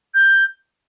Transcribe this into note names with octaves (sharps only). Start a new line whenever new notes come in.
G6